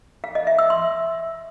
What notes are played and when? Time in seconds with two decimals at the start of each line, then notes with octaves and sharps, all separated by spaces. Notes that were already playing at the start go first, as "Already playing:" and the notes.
0.24 F5
0.35 D#5
0.47 E5
0.59 E6
0.70 C6